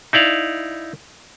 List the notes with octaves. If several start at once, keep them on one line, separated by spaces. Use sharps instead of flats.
D#4 E4 D5 F5